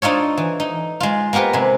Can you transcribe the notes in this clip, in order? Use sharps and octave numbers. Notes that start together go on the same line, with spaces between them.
D4 D#4 F4 A4 C#5
E3
D#4
G#3 F4
A#3 B3 G4 A#4 B4
C3 G#3